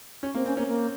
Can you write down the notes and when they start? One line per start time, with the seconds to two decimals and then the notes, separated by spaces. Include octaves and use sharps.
0.23 C#4
0.34 A#3 C4
0.45 C4 C#4
0.57 A#3 C#4
0.67 A#3